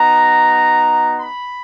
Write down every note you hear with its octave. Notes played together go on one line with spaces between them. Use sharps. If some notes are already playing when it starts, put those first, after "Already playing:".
Already playing: B3 D#4 F#4 A#5
B5